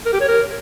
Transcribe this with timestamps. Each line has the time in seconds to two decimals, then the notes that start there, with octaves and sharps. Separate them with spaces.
0.06 A#4
0.13 G4
0.21 C#5
0.28 A#4